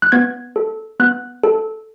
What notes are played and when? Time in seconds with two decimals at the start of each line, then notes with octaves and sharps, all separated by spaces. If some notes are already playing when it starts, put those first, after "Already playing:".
0.02 F#6
0.12 B3 G#6
0.56 A4
1.00 B3 F#6
1.43 A4